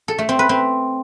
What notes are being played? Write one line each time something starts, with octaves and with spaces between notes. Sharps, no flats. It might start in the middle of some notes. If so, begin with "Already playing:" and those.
A4
A3
C4
B4
C4